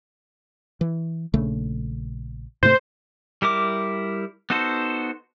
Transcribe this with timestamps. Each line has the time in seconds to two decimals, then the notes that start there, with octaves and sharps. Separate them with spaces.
0.81 E3
1.34 A#1 C#3 A3
2.63 G#2 C3 A3 C5
3.42 G3 E4 A#4 D6
4.50 B3 D#4 F#4 A4 C5